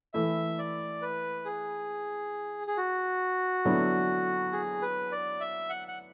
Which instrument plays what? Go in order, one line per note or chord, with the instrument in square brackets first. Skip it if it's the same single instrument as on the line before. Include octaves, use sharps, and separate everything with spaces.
[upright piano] E3 A3 E4 [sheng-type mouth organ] E5
[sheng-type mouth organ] D5
B4
G#4
G#4
F#4
[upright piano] D3 F#3 B3 E4 A4
[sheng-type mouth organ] G#4
B4
D5
E5
F#5
F#5